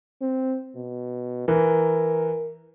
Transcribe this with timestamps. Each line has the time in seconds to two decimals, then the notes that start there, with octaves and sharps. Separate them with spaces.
0.21 C4
0.75 B2
1.48 E3 A#4